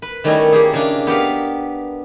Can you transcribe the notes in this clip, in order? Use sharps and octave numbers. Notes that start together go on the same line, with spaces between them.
B4
D#3 G3 A3 C#4 E4 D#5
A#3 G4 G#4
C#3 D4
B3 G4 A#4 F5